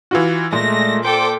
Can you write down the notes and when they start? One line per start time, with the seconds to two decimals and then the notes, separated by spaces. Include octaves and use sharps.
0.11 E3 F4 F#4
0.53 A#2 G#3 A3 A#6
1.05 A4 C5 G5 D6